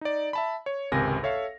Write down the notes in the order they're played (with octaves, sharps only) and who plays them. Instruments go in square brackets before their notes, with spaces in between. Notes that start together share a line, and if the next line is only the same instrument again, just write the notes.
[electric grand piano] D#4 D5
E5 A5 B5
C#5
G#1 C#2 C3 A#4 G#5 A#6
A4 C#5 E5 F5